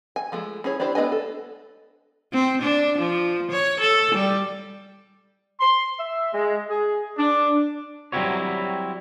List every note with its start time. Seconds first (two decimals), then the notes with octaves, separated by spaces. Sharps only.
0.16 G#5
0.32 F3 G#3 A3
0.64 C#4 E4 G#4 C#5
0.80 D4 E4 G4 C5
0.95 A3 B3 D4 D#5 G#5
1.12 A4
2.33 C4
2.62 D4
2.99 F3
3.52 C#5
3.80 A4
4.15 G3
5.59 C6
5.99 E5
6.32 G#3
6.69 G#4
7.17 D4
8.12 F#3 G3 C4 E4 F#4 C#5